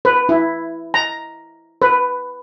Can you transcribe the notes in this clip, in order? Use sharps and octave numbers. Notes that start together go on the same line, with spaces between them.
B4
E4
A#5
B4